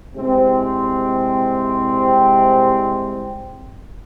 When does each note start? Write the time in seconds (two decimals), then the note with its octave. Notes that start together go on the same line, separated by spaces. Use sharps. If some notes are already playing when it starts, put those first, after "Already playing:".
0.14 C2 C3 G#3 C4